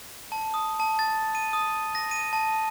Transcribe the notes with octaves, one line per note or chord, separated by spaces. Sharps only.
A5
D#6
A5
A6
D#7
D#6
A#6
D#7
A5